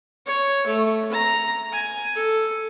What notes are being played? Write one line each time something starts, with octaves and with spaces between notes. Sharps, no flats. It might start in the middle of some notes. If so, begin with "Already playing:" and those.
C#5
A3
A#5
G#5
A4